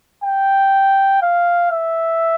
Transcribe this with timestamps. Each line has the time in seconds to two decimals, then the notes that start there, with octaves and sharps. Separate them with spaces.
0.24 G5
1.22 F5
1.72 E5